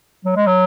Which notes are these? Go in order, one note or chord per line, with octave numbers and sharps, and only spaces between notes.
F#3
G#3
F#3